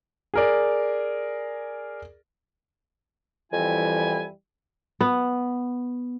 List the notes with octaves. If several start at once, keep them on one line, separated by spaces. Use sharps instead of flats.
G#4 A#4 D5
F2 E3 G3 E4 G#5
B3